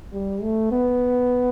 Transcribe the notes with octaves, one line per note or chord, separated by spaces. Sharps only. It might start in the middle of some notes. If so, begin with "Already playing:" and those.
G3
A3
B3